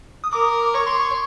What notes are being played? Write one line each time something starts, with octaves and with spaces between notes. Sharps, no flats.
D#6
A#4 D6
C#5 C#6
C6
C#6